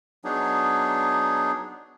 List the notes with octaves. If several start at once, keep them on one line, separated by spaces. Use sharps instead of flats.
F#3 B3 D4 D#4 G#4